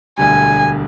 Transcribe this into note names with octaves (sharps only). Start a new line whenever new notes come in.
E1 D2 D3 G3 G#5